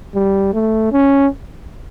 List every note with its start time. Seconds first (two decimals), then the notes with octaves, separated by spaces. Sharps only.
0.15 G3
0.53 A3
0.92 C#4